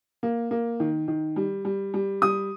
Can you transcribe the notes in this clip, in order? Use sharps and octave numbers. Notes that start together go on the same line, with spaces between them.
A#3
A#3
D#3
D#3
G3
G3
G3
G3 D#6